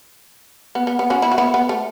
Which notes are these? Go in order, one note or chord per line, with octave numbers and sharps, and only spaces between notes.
B3
B3
B3
C#4 F#4
B3 E4
F#4
B3 E4
B3
A3